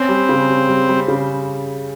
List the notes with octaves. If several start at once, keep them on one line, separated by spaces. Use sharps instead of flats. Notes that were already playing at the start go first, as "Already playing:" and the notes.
Already playing: C4 C#4
G3
C#3
G3
G3
G3
C#3